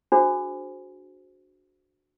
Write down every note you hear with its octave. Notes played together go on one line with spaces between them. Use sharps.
D4 F#4 G#4 C5